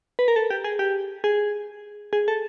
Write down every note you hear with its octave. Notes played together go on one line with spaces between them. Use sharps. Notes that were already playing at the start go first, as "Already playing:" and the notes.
B4
A#4
A4
G4
G#4
G4
G#4
G#4
A4